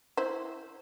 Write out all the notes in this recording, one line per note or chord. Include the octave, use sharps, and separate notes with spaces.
E4 C5